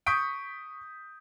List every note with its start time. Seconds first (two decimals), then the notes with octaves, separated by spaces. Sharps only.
0.06 C#6 D#6 G6 B6 D7